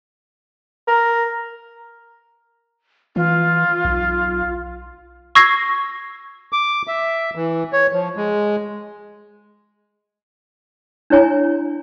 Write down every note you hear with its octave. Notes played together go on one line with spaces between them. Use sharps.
A#4
E3 F4
B1
C#6 E6 G#6 A#6 C7
D6
E5
E3
C#5
F3
G#3
D4 E4 C#5 G#5 A#5